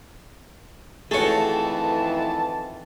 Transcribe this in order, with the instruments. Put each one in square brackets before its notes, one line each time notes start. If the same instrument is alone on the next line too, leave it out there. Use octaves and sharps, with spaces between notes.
[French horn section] F2 D#3 E3 [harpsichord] A3 F#4 [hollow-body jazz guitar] G#4 C#5 [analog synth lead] A5